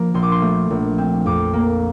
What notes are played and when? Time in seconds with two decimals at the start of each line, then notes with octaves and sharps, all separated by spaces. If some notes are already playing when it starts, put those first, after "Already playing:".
Already playing: F3 A#3
0.14 A#1 C6
0.23 D6
0.32 C6
0.42 A3
0.70 A#1
0.98 C4
1.26 F2 D6
1.53 A#3